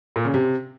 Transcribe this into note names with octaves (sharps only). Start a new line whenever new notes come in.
A#2
C#3
C3